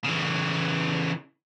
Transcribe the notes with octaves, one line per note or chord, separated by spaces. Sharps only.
C#3 E3